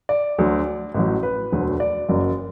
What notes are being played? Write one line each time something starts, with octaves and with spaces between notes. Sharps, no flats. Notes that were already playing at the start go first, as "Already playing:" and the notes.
D5
D2 D3 F#3
A1 A2 F#3
B4
E1 D2 D3 F#3
D5
F#1 F#2 F#3